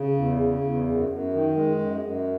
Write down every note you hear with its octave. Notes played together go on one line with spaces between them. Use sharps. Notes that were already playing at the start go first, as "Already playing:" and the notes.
Already playing: C#3
E2
C#3
E2
F#2
F#2
D#3
G#3
F#2
F#2